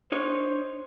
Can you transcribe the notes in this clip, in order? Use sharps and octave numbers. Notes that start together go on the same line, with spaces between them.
D4 D#4 C5 C#5